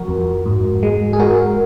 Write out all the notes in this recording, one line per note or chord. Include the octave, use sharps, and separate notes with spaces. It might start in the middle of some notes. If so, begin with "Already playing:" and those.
Already playing: F3 F#4 A#4
F2
G#2
G#3
G#4
G#3 F#4 A#4